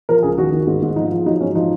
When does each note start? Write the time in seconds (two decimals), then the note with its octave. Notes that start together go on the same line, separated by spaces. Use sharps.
0.09 F3 A#4
0.23 C#2 G#4
0.38 D#3 F#4
0.52 D#3
0.67 G#2
0.82 G#2
0.96 F3 D#4
1.10 F3
1.26 F#3 D#4
1.40 G#2 C#4
1.55 F3 D#4